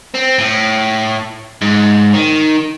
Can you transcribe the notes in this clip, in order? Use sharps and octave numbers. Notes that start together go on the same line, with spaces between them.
C4
A2
G#2
D#3